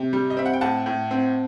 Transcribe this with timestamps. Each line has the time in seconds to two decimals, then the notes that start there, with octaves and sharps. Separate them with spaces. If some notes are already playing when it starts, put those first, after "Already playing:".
Already playing: C3 G5
0.13 G3
0.30 D#5
0.37 C4 E5
0.46 F#5
0.54 G5
0.61 A2 F#5 A5
0.86 A2
1.11 C4